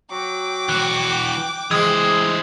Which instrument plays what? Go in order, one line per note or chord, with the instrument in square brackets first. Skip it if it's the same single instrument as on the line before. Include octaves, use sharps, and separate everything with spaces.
[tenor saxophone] F#3 [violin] G5 D6
[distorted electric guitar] E3 F#4 [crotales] F#6
[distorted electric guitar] E3 C5 [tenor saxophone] G#3 [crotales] D#6 E6 G#6